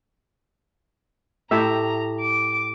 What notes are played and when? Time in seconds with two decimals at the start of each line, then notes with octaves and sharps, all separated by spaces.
1.51 A2 G4 E5 A#5
2.21 D6